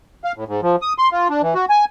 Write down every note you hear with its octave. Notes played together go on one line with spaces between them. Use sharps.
F5
A2
G#2
F3
D#6
C6
F4
D4
E3
F#4
G#5